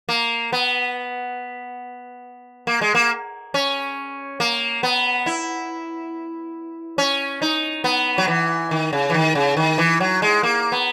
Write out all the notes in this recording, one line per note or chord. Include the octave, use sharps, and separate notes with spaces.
A#3
B3
A#3
G#3
A#3
C#4
A#3
B3
E4
C#4
D#4
B3
F#3
E3
D#3
C#3
E3
D#3
C#3
D#3
E3
F#3
G#3
A#3
B3